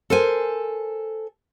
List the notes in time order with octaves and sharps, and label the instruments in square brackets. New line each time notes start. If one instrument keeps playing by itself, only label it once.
[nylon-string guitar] A4 A#4 C5 G#5